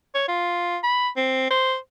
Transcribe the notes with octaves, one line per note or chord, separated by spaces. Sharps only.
C#5
F4
B5
C4
C5